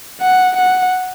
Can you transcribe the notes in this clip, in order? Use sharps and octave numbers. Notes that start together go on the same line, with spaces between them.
F#5
F#5